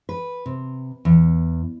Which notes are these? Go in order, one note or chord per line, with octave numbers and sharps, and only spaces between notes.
B4
C3
E2